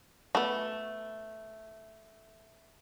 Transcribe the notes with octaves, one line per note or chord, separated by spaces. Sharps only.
A3 B3 F#4